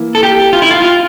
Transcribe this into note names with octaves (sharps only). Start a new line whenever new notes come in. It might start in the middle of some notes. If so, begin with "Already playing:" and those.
Already playing: E3 A#3 E4
A4
G4
F4
E4
F4
F4